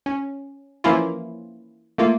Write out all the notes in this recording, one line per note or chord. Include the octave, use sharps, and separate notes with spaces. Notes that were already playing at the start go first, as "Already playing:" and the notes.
C#4
E3 F3 A#3 C#4 E4 F4
A3 A#3 F4